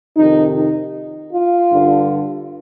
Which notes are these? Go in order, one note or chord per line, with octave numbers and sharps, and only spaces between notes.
F2 C3 D#3 D#4
D#4
F4
G2 D3